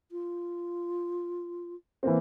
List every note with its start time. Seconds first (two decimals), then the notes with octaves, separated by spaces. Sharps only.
0.12 F4
2.03 E3 A#3 C4